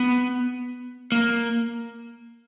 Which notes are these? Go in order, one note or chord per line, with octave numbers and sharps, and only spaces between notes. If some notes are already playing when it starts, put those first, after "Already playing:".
Already playing: B3
A#3